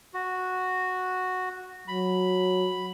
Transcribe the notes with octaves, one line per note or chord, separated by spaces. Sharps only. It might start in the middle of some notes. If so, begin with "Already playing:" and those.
F#4
F#3 B5